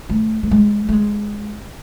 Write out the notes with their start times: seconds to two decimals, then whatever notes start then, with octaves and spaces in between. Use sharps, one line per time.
0.09 A3
0.43 A3
0.51 G#3
0.89 A3
0.92 G#3